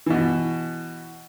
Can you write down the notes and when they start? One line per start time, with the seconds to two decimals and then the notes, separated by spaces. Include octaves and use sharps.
0.06 B2 E3